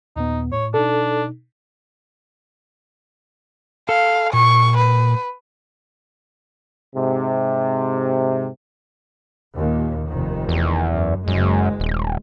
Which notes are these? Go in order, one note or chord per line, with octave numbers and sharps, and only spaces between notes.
D#2 A#2 B3 D#4
A2 C#5
B2 D4 D#4 A4
A4 F5
A#2 C#6
B4
G#2 C3
D#2 A#2
F1 D#3
E2
F#2
F#1 F#2 G#3
D#1